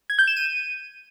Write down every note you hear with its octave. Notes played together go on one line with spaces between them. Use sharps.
G#6
G6
E7
D#7